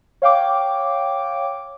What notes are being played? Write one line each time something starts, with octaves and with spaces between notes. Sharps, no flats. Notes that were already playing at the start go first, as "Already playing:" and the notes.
C#5 F5 G5 D6